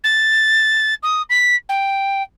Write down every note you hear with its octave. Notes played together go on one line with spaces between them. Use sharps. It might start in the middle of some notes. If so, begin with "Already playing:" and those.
A6
D#6
B6
G5